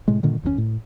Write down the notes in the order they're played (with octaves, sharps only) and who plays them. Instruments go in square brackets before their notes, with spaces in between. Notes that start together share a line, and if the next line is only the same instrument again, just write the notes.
[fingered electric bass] A2 C3 G#3
G2 A#2 D3 D#3
F#1 D#2 C#3 C#4
A2